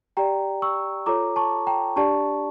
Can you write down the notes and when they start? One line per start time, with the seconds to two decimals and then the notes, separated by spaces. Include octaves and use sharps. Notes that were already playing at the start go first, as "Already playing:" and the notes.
0.17 G4 D5 G5 A#5
0.62 C#6 E6
1.06 F4 A4 C#5 A#5 D6
1.36 A5 C#6
1.67 G5 A#5
1.96 D4 G4 D5 A5 C#6